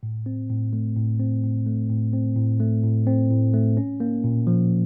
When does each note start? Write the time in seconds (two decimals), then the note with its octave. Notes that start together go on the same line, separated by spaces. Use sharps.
0.03 A2
0.26 C4
0.50 A2
0.73 A3
0.96 A2
1.20 C4
1.43 A2
1.67 A3
1.90 A2
2.13 C4
2.37 A2
2.60 A3
2.83 A2
3.07 C4
3.30 A2
3.53 A3
3.77 C#4
4.00 A#3
4.24 A#2
4.47 F3